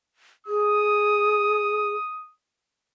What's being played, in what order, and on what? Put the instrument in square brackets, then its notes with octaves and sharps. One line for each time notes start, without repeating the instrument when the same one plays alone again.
[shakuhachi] G#4 [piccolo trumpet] D#6